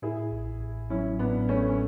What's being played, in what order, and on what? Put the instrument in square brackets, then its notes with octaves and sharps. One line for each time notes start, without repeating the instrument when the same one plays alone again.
[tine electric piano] A2 [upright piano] E4 G#4
[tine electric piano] A1
A1
[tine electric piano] F#3 [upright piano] C#4 E4
[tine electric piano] A2 [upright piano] B3 D4
[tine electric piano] A1 [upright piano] A3 C#4
[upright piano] C#4